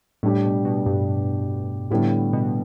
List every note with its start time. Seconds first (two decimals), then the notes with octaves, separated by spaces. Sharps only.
0.23 A2 G3 D4 G4
0.45 B2
0.65 B2
0.86 G2
1.90 A2 D3 G3 B3 E4 G4
2.33 B2